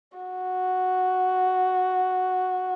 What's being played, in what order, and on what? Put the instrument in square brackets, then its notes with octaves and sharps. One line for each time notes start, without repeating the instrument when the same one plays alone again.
[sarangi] F#4